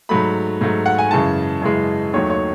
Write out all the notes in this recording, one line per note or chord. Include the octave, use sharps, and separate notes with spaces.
G#2 F#3 A3 B5
G#2 F#3 A3
F#5
G#5
F#2 C#3 E3 G#3 A5
F#2 C#3 E3 G#3
D#2 D#3 F#3 A3 C#5
C#5